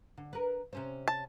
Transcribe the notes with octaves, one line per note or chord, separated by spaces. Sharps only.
D3
A#4 B4
C3 C#4 C5
A5